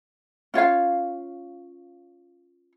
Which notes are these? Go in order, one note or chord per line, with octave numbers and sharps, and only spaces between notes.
C#4 F4 C#5 F5